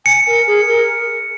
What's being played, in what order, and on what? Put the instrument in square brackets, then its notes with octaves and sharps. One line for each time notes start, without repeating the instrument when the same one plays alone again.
[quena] G#5 [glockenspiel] C#7
[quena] A#4
G#4
A#4